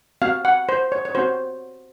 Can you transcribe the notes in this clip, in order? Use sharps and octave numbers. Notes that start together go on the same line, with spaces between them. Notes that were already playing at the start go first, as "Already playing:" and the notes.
C4 F#4 F5
F#5
C5
C#5
C#5
C4 F#4 C5